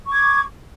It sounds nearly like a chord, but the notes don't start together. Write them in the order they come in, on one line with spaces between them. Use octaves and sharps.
C#6 D6 G#6